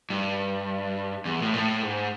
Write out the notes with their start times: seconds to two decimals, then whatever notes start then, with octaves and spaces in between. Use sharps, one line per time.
0.10 G2
1.25 E2
1.42 A2
1.54 A#2
1.57 A2
1.82 G#2